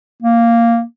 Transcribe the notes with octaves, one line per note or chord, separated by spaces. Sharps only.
A#3